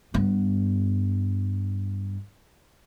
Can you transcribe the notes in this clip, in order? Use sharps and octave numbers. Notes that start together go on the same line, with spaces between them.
G2 B3